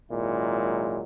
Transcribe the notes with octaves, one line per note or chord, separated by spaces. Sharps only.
G#1 A#2 F#3 G#3 E4